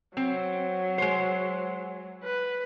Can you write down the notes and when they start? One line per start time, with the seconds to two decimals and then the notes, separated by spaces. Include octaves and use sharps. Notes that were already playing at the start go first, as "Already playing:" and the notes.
0.17 F#3 C4
0.98 G#3 C5
2.24 B4